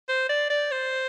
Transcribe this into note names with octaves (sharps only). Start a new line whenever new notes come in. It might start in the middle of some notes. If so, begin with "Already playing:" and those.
C5
D5
D5
C5